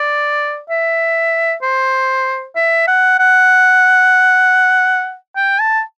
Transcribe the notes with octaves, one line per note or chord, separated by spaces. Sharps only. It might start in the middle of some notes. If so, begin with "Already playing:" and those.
Already playing: D5
E5
C5
E5
F#5
F#5
G5
A5